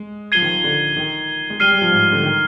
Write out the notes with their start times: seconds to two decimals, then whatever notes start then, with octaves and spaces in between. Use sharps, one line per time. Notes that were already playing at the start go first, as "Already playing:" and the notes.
Already playing: G#3
0.32 F3 G#6 C7 D#7 G7
0.42 D#3
0.54 F3
0.64 D3
0.97 D#3
1.50 G#3
1.60 G3 F6 C7 D#7 G7
1.71 G3
1.82 F3
1.92 G#2
2.12 D3
2.23 D#3